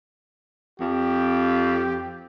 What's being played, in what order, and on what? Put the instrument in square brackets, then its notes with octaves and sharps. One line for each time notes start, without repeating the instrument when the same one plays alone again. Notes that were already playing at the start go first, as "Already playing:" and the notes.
[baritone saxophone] F2 [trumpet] G4